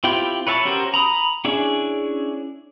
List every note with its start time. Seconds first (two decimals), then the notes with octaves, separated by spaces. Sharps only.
0.04 C4 E4 F4 G4 G5
0.47 B4 C#5 E5 A5
0.65 C#4 F#4 G4 A#4 C5
0.94 A#5 B5 D#6
1.45 C#4 D4 E4 G#4